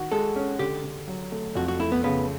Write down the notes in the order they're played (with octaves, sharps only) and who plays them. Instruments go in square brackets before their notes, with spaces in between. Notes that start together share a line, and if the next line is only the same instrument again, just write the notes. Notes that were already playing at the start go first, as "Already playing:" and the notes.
Already playing: [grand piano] D#3 F#4
[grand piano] G#3 [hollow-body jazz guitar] A4
[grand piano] C#4
[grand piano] D3 [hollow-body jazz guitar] G4
[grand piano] D3
F#3
A3
[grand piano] F2 [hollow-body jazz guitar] F#4
[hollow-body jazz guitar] F#4
[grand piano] A3 [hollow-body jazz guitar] E4
[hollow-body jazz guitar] B3
[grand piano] C#3 [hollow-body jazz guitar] B3